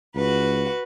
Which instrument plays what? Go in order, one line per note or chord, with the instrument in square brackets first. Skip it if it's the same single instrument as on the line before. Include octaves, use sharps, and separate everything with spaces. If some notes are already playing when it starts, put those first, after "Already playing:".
[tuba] C#2 [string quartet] F#4 B4